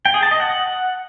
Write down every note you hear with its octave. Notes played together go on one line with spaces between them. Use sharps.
G5
G#4
A5
D#5
F#5